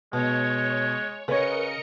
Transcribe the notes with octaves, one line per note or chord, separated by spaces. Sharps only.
B2 G#3 C#5
C#3 A#4 B4 C#5 D#5 C#7